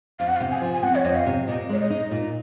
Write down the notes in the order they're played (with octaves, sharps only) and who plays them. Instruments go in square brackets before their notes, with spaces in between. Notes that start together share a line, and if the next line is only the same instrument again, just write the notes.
[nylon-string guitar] F2 [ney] F5
[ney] F#5
F5
[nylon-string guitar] C3
[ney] G#5
[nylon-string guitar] F3
[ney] G#5
[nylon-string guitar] C4 [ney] F#5
[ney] C#5
[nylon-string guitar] F2 [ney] D#5
[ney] F5
[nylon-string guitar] C3
[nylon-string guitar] A#2 [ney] D#5
[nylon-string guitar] G#3 [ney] C#5
[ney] D#5
[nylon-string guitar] D#4
A#2